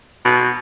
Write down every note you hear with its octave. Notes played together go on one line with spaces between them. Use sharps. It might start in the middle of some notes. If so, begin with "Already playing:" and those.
B2